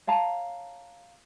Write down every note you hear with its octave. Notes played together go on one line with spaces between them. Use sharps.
C#5 F5 A5 A#5